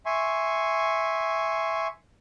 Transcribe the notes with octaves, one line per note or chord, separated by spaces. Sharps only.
E5 G#5 C6 C#6